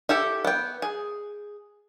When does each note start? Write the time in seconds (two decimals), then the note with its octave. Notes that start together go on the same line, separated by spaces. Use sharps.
0.09 E4 G4 A4
0.45 B3 G5
0.82 G#4